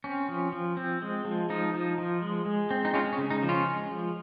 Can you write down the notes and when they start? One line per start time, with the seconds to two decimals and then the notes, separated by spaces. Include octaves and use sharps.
0.04 C4 C#4
0.29 F3
0.53 F3
0.77 C4
1.02 G#3
1.25 F3
1.50 F3 D#4
1.74 F3
1.98 F3
2.22 G#3
2.46 G#3
2.71 C4
2.85 D#4
2.94 G#3 C#4 F4
3.13 C#4
3.18 C#3
3.30 D#4
3.42 F3
3.49 C#4 F4
3.67 G#3
3.91 F3